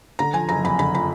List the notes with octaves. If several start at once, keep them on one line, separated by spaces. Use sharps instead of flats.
D3 A#5
F3 G#5
F#1 A#5
F2 B5
D3 B5
F3 B5